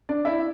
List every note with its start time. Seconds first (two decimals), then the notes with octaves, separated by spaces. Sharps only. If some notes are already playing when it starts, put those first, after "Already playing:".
0.09 D4 D5
0.25 E4 E5